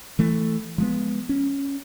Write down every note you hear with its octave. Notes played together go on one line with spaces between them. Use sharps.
E3 A3
F3 G#3 B3
C#4